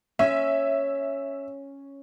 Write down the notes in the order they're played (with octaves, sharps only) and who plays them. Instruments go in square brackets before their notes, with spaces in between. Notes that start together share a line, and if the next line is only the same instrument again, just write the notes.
[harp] C#4 [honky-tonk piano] E5